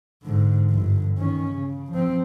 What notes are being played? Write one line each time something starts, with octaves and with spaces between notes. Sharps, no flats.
G#2 D3
G1 D3
D#3 C#4
C#3
F3 C4